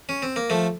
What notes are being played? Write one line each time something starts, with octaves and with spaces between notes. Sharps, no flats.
C#4
C4
A#3
F3 A3